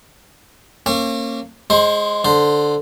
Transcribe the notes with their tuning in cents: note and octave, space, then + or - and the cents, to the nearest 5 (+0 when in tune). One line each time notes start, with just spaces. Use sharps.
A#3 -25 C#4 -40 G#5 -30
G#3 +0 C5 +25
D3 +0 C5 +0